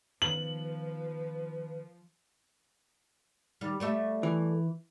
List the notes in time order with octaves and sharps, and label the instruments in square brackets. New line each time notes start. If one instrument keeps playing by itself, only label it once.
[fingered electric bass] D#3 B3 [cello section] F3 [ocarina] B4 [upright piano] F#7
[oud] D#3 G3
G3 A3 E5
[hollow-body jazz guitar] E3